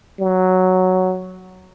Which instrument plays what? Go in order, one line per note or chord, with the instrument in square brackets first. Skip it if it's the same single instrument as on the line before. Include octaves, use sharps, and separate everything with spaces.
[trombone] F#3